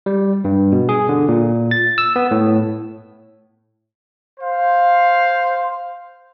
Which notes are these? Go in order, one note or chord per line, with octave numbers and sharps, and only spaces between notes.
G3
G2
B2
G#4
D3
A#2
A6
E6
B3
A2
C5 F5